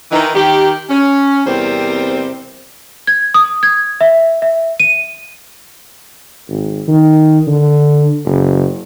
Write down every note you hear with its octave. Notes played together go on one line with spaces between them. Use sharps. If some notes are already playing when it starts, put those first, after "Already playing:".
D#3 E3 D#4
D#3 G4
C#4
E2 C3 G3 C4 A#4 C5
G#6
D#6
G#6
E5
E5
D#7
G#1
D#3
D3
F#1